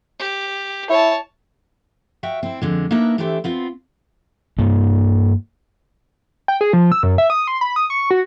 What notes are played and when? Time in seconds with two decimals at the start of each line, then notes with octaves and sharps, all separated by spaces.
0.19 G4
0.89 E4 C#5 A5
2.23 F#4 E5 F5 G5
2.43 C4 E4
2.62 F2 D3 G#3
2.91 A#3 D4 D#4 A#4 B4 E5
3.18 E3 A3 D4 G4 C5 E5
3.44 B3 C4 F4
4.58 G2 A#3
6.48 G5
6.61 G#4
6.73 F3
6.92 E6
7.03 F#2
7.18 E5
7.30 D#6
7.48 C6
7.61 B5
7.76 D#6
7.90 C#6
8.11 F#4